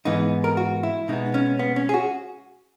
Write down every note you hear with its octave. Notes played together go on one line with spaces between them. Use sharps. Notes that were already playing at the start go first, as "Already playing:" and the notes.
G#2 E3 B3 D#4
A#4
F#4
E4
B2 G#3 B3 D#4
C#4
B3
C#4
G#4
F#4